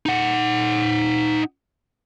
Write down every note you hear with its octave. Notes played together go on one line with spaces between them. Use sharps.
D#4 F#5